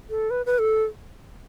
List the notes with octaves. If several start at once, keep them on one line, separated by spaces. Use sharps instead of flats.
A4
B4
B4
A4